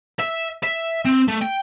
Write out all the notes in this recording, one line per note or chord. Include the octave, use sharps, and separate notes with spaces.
E5
E5
C4
A3
G5